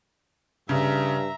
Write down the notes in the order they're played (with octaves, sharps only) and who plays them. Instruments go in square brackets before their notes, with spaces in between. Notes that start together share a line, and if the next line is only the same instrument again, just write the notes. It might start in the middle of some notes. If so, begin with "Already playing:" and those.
[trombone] G2 [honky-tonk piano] C#3 [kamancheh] E5 A#5